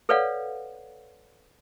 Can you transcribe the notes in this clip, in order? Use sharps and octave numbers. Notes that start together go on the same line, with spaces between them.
A4 B4 C#5 D5 F5 F#5